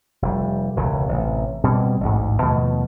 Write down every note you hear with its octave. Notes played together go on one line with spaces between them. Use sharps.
F1 G3
E1 C#2 C#3
A1 C3
B2 G3 C4
A1 D2 G#2
D#2 B2 F3 A3